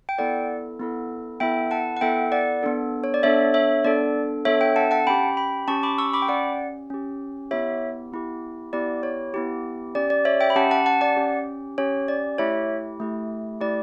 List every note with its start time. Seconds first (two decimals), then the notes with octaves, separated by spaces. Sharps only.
0.09 G5
0.18 B3 E4 A4 D5 F#5
0.80 B3 E4 A4
1.40 B3 E4 A4 E5 G5
1.71 F#5 A5
1.97 F#5
2.01 B3 E4 A4 E5 G5
2.32 D5 F#5
2.63 B3 D4 A4
3.04 C#5
3.14 D5
3.23 B3 D4 A4 C#5 E5
3.54 C#5 E5
3.84 B3 D4 A4 D5
4.45 B3 D4 A4 C#5 E5
4.61 E5 G5
4.76 F#5 A5
4.91 F#5 A5
5.07 C#4 G4 G5 B5
5.37 G5 B5
5.68 C#4 G4 A5 C#6
5.83 B5 D6
5.98 C#6 E6
6.13 B5 D6
6.22 G5
6.28 C#4 G4 D5 F#5
6.90 C#4 G4
7.51 B3 E4 G4 C#5 E5
8.12 B3 E4 G4
8.73 B3 E4 G4 D5
9.03 C#5
9.34 B3 E4 G4
9.95 C#4 G4 D5
10.10 D5
10.25 C#5 E5
10.40 E5 G5
10.50 B5
10.56 C#4 G4 F#5 A5
10.71 F#5 A5
10.86 F#5 A5
11.01 D5 F#5
11.17 C#4 G4
11.78 C#4 G4 C#5
12.08 D5
12.38 A3 E4 G4 C#5 E5
13.00 A3 E4 G4
13.61 A3 E4 G4 D5